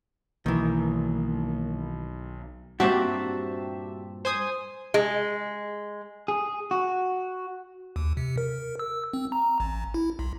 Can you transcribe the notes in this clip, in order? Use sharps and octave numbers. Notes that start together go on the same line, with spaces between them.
B1 D#3 E3 A#3
G2 A#2 C4 F#4 G4 E5 A5
C5 G#5 D#6
G#3
G#4
F#4
D#2
C3
A#4
E6
C4
A#5
A1
E4
B1